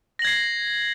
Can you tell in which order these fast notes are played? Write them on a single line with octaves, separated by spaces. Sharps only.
A#6 F#7 G#6 C7